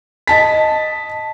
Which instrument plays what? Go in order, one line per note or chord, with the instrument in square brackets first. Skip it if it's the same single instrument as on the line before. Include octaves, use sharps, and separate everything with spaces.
[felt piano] D#5 A5 B6